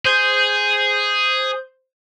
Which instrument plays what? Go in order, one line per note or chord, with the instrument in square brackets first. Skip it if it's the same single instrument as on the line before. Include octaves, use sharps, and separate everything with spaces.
[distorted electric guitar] G#4 [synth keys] C5 G6